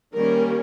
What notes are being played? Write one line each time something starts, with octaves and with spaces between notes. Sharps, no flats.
D#3 G3 A#3 C#4 A#4